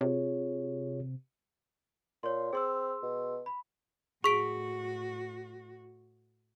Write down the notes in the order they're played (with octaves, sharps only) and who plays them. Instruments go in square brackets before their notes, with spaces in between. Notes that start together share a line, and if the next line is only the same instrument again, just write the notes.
[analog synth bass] C3 [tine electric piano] F4 G#4 C#5
[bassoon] A#2 [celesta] C#5 C6
[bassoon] C4 [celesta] G#4 C6 E6
[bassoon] B2
[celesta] B5
[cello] A2 F#4 [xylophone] G#4 B6 D7 [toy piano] C#6